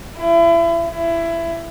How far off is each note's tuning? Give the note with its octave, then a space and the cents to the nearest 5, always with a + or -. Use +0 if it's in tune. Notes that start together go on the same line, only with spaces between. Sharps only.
E4 +35
E4 +20